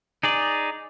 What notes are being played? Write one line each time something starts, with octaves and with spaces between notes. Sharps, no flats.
D#4 G#4 D5